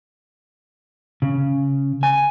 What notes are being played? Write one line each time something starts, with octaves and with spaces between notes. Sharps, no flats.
C#3
G#5